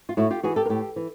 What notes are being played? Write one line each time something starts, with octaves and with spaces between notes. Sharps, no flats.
F4
A2 E4 F#4
F4 G4
E3 F#4 G#4
G4 A4
A#4
A2 G4 A4
E3